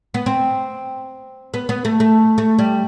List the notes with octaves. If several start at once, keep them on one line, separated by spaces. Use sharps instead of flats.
B3
C4
B3
B3
A3
A3
A3
G3